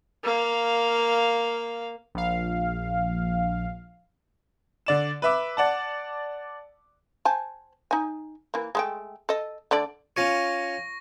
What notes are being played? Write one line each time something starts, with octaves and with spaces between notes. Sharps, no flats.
A#3 F5
A#1 F5
D3 D5 E7
B4 E5 D6
D5 F#5 A5
C5 G#5 A5
D#4 G#5
E3 A#3
G#3 A3 G5
A4 D#5
D3 A3 D5
C#4 F4 C#5 C#6 A#6